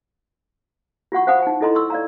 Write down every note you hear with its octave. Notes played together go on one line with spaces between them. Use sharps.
F4 F#4 F#5 C#6
C5 F5 F#5 G#5 B5 D#6
D#4 G#5
E4 F4 A4 D#5 A#5 C6
C6 C#6 E6
D5 F5 A#5